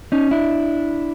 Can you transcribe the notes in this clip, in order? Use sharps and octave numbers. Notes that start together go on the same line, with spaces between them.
C#4 D#4
D4 E4